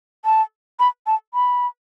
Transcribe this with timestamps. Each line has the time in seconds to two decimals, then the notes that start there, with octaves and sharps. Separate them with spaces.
0.25 A5
0.79 B5
1.07 A5
1.34 B5